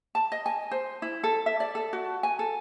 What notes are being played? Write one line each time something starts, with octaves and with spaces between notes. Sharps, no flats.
A5
D#5
G#5
C5
E4
A4
E5
D5
A4
F#4
G#5
A4